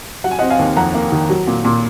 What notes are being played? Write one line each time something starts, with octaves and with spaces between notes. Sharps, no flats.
F#3 F#5
G#5
C4 D#5 F#5
F5 G#5
D#2
F2 F#5 A#5
A#3
D#3
F#3
A#2
A#2